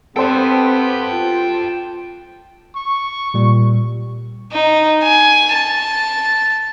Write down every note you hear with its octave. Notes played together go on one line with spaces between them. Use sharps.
B3 C4 G4 A4 C5 G5 A5
F4
C#6
A#2 G3
D#4
G#5
A5